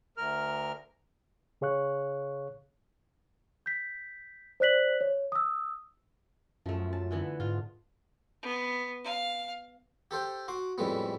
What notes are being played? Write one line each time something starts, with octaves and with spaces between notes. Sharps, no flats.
D2 A#4 F6
C#3 G#4 C#5 F5 C#6 F#6
G6 B6
C5 D5 F#6 B6 F#7
C#5
D#6 E6
F#2 F3 A3
A5
D3 E3 B3
G#2 F4
B3
F5
G4 A4 C5 G5
F#4 C6 D6
F2 A2 G3 G#3 B3